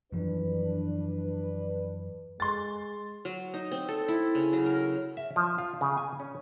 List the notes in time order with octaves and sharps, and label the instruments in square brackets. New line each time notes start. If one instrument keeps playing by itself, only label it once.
[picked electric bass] F#2 E3 F3 [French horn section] D4 B4
[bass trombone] G#3 [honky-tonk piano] C6 A6
[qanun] F#3
D#4
C4
A4
E4
C#3
F#3
A#4
[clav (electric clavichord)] E5
F3
F4
C#3
G#5
C#4